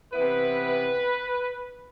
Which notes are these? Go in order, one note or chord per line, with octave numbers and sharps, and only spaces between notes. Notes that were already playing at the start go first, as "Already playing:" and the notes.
C3 E3 B3 E4 B4